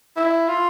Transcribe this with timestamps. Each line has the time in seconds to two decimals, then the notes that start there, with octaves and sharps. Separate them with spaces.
0.16 E4
0.48 F4